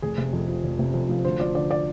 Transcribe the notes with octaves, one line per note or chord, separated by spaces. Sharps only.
F1 G#4
C3
F2
F3
F1
C3
F2
F3
D2 C5
F3 D5
D3 D5
D5